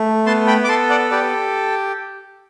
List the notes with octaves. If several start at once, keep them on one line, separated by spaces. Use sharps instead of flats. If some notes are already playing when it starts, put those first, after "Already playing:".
Already playing: A3
B3 A5 C6
G5 B5
D6
A4 A5 C6
D5 F#5
G4 B4 D5